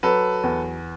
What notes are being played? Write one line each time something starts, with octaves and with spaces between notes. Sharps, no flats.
F#3 A4 B4
E2